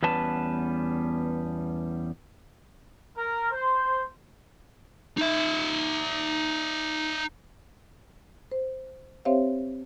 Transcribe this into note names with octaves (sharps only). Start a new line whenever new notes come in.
E2 G3 B3 C#4 B4 A5
A#4
C5
D#4 E5
C5
C4 G4 C5 C#5 E5 F5